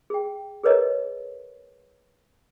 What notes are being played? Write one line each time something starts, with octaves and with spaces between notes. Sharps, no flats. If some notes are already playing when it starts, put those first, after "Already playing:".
G#4 G5
G#4 A#4 B4 C#5 D#5 A#5